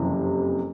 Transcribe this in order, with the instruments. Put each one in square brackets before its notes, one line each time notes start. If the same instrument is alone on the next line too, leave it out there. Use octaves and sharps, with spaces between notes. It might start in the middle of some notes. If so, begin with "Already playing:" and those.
Already playing: [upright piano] F#1 F2 C3 E3